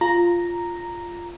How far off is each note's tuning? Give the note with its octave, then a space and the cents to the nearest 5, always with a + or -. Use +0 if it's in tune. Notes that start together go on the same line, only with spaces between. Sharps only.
F4 -5 A#5 +0